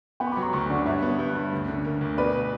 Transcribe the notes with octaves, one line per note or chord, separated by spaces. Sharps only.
B3 G5 B5
C#6
B5 D6
F#3
A#5 C#6
D2 A#5 C#6
D3 D5 F#5
G2 C#5 E5
B3
G2
G2
D2
D3
A#3
D2
B2 B4 D5